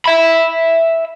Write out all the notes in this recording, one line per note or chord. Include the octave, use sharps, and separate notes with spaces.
E5 B5